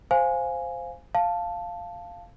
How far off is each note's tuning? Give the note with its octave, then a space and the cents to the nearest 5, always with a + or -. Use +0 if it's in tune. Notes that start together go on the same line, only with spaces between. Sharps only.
C5 +0 F5 +0 G#5 +0
F5 +0 A5 +0